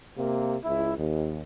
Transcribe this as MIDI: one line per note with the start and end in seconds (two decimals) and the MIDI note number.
0.17 0.55 48
0.17 0.55 58
0.64 0.93 37
0.64 0.93 64
0.97 1.40 39